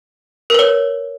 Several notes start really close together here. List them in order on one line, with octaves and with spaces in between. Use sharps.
A#4 B4 C#5